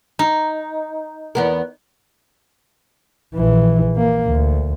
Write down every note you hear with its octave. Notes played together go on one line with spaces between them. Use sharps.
D#4
E2 B3 A#4
A#1 E3
A#3
D2